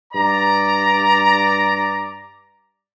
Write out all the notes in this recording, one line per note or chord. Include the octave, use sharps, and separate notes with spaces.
G2 D5 A#5